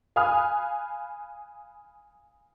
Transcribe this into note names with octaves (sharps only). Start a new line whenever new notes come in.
F5 G#5 B5 D#6 F6 F#6